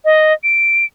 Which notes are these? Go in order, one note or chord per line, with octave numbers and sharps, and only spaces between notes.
D#5
D7